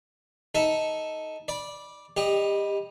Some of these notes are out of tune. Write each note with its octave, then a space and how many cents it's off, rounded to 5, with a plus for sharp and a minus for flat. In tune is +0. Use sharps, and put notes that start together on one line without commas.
D#4 +10 A4 +0 E5 +0
D5 +0 B5 -20
G3 +0 G4 +25 D#5 +0